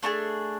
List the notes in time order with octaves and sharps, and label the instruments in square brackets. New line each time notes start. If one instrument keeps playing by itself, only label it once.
[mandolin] A3 D4 F4 G#4